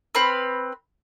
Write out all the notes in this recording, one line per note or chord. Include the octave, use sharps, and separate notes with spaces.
C4 B4 B5 F6